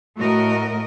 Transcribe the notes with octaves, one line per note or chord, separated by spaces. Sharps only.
A2 A3 F#4 A#4 D#5